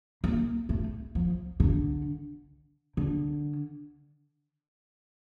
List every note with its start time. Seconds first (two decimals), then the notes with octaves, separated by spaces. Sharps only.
0.24 A#3
0.69 A3
1.15 F3
1.60 D3
2.97 D3